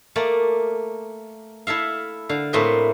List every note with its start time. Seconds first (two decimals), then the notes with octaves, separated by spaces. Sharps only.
0.16 A3 A#3 D5
1.67 E4 A4 E5 F5
2.29 D3 F5
2.53 A2 A3 A#3 C4 B4 D#5